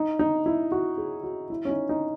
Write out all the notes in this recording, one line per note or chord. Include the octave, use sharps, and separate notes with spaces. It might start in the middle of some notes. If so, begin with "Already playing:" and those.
Already playing: D#4
D#4
E4
F#4
G#4
F#4
E4
C#4
D#4
D#4